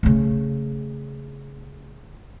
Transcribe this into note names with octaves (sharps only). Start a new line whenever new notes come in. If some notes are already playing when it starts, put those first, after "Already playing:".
C#3 A3